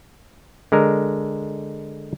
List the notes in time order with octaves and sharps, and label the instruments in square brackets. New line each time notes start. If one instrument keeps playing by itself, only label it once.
[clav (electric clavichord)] D3 G#3 A#4